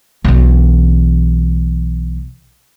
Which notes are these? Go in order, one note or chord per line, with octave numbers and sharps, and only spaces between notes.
B1 E3